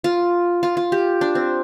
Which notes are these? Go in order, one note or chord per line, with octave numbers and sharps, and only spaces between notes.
F4
F4
F4
G4
D4
C4